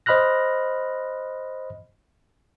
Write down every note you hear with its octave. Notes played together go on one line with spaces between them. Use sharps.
C5 D#5 B5 F6 F#6 A#6